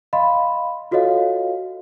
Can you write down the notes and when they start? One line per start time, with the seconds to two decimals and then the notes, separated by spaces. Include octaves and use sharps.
0.13 D#5 F5 B5 C6
0.91 F4 F#4 A4 C#5 D#5 F5